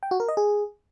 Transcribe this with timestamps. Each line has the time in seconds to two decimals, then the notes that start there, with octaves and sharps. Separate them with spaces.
0.03 G5
0.11 F#4
0.20 A#4
0.28 D#5
0.37 G#4